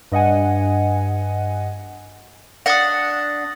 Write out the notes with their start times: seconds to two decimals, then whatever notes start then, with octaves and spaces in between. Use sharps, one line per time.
0.12 G2 D#5 F#5 G#5
2.66 D4 F#5 D#6 A6 A#6